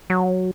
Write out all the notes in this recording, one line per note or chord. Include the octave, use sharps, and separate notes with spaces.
F#3